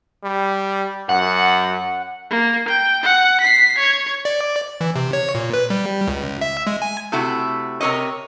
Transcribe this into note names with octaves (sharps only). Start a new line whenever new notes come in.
G3
F#2 F#5
A#3
G5
F#5
B6 C7
C#5 G#6
D5
E3
C3
C#5
A#2
B4
G3
C#2
E5
G#3
G#5
C3 A3 E4 F#4
C3 A#4 C#5 D#5